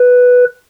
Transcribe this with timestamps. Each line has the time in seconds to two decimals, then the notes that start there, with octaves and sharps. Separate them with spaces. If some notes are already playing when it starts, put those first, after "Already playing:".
Already playing: B4